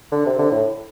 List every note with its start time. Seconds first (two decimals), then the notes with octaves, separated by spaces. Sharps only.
0.12 D3
0.26 C3
0.39 D3
0.51 A2